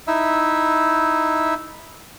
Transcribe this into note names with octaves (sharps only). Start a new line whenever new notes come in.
D#4 E4 E5